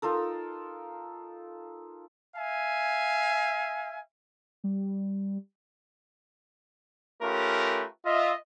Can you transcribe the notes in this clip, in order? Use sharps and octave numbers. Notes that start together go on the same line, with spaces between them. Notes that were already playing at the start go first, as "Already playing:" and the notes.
D#4 F4 A4 A#4
E5 F5 G#5
G3
A3 C#4 F4 G4 A#4 B4
F4 D#5 E5